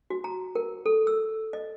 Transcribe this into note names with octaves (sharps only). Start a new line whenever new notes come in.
F#4
A#5
A#4
A4
E6
D#5